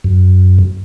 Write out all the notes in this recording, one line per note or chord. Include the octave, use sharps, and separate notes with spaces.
F#2